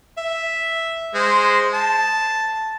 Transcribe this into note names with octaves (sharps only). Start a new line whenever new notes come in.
E5
G#3 C5
A5